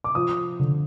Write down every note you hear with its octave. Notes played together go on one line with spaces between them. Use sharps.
D6
F3 D#6
D3